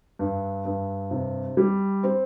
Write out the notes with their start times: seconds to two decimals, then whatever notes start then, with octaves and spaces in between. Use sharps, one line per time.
0.19 G2
0.65 G2
1.11 C3
1.57 G3
2.03 C4